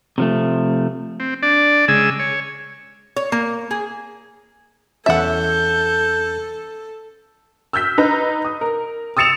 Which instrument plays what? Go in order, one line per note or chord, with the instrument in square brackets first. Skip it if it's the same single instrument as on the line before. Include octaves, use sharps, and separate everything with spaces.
[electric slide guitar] C3 F3 A3
[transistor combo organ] C4
D4 D5
C#3 G#3 G#5 E6
C#5
[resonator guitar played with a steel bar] C#5
A#3
G#4
[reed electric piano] E2 C#4 A5 [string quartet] A4 [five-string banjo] E5 F#5 [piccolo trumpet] G6
[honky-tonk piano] E6 F6 G6 B6
D#4 B4 A#5
D#6
A#4
D#6 E6 A6 C#7 E7 F7